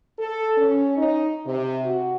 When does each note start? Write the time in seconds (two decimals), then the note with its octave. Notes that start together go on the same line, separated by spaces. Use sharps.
0.19 A4
0.56 C#4
0.96 D#4
1.45 C3
1.83 F#4